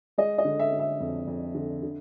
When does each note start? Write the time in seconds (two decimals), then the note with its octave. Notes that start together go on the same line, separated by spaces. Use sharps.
0.18 G#3 D#5
0.38 D#5
0.45 D3
0.59 E5
0.72 D3
0.79 E5
1.00 F2
1.27 F2
1.55 D3
1.83 D3